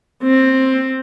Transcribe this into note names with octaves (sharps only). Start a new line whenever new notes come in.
C4